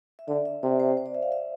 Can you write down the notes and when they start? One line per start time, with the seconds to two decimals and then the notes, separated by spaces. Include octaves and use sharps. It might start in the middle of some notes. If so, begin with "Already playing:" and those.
0.19 E5
0.28 D3 D5
0.45 E5
0.63 C3 D5
0.80 C5
0.97 C5
1.06 D5
1.14 E5
1.22 F5
1.32 E5